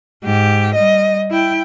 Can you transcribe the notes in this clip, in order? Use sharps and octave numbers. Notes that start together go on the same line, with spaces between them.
G#2 G4
G3 D#5
E4 G5